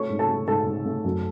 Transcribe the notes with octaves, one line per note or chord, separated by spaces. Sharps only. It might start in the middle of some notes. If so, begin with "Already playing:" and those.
Already playing: A3 C#5 C#6
G#2
A4 A5
A3
G#2 A4 A5
G#2
A3
F#2